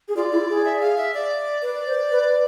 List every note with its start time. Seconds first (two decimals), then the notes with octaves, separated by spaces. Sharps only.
0.08 G#4
0.16 F4 D5
0.32 E4
0.49 G#4
0.65 E5
0.81 F5
0.98 E5
1.14 D5
1.62 B4 D5
1.87 C5
2.11 B4